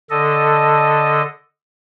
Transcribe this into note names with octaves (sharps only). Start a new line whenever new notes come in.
D3 A4 D#5